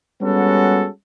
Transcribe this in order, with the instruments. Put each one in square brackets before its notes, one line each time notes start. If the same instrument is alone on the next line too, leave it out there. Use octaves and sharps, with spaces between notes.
[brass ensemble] G3 G#3 B3 C#4 F#4 A4